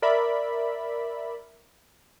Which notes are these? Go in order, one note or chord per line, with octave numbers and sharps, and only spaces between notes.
A#4 D5 E5 B5